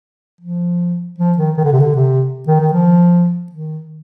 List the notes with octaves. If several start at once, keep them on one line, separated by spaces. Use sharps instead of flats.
F3
F3
D#3
D#3
D3
C3
D3
C3
D#3
D#3
F3
D#3